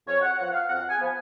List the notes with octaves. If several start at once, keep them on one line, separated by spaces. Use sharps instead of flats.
F2 C#5
F#5
F3 B3 F#5
F5
F2 F#5
G#5
F3 B3